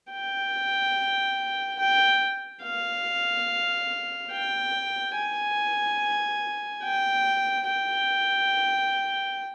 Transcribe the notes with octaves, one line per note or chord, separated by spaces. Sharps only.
G5
G5
F5
G5
G#5
G5
G5